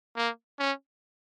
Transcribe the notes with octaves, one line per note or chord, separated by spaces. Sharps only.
A#3
C#4